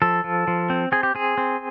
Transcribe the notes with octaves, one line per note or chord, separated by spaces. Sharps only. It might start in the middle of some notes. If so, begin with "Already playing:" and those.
F3 A4
F3
F3
C4
C4 G#4
G4
C4 G#4
C4